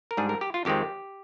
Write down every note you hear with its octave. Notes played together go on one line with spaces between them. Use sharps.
A#4
G#2 G3 D4 G#4
A#4
G4
F4
F2 D#3 G#3 C4 G4